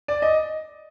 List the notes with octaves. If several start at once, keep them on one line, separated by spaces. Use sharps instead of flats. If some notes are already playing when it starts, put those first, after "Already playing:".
D5
D#5